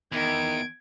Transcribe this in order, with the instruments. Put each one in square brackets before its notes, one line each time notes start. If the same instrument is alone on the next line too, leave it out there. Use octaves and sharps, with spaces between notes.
[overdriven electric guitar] E2 [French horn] D#3 [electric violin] G#6 D7